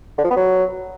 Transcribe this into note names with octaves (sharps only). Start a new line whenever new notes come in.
D3
F3
B3
F#3